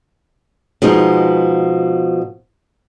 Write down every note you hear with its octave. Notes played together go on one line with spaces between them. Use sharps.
B2 F3 G#3 D#4